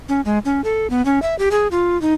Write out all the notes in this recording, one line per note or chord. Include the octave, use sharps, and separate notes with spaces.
C#4
G#3
C#4
A4
B3
C#4
E5
G4
G#4
F4
D#4